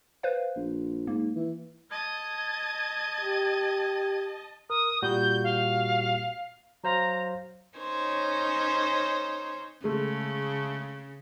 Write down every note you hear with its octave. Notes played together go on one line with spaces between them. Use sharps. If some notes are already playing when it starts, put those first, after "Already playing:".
B4 C5 F5
A#1
G#2 A#3
E3
D#5 A5 G#6
G4
A#4 D#6
A#2 G3 F#4 G6
F5
F#3 C5 F5 A#5
C#4 D#4 C5 C#5
C#3 G#3 A3